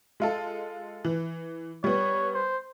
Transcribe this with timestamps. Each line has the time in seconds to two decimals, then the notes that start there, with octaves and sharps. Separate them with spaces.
0.20 G#3 F4 A4
1.05 E3
1.84 G3 B3 C#5
2.35 C5